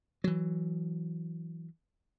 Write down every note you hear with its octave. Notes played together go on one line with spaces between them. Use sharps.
E3 F#3